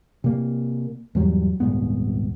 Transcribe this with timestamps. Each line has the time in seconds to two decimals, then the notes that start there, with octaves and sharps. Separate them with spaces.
0.24 C3 A#3
1.15 E2 G#2 F#3 G3
1.60 D#1 C2 G#2 B3